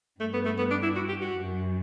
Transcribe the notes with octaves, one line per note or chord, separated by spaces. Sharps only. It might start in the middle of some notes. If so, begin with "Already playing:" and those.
G2 A3
B3
A3
B3
D4
E4
F#4
G4
F#4
F#2